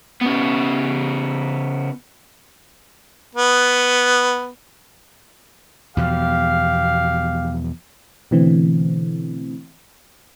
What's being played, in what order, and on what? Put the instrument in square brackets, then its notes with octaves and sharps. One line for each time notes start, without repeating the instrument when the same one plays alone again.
[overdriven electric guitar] C#3 B3
[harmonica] B3
[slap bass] E2 B2 F3 [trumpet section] G4 F5
[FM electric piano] B2 D3 E3 A3 C4